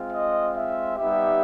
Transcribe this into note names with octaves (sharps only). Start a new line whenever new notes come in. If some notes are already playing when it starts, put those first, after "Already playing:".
Already playing: G#3 C4 F4
D#5
E5
G3 B3 D#4 G4 E5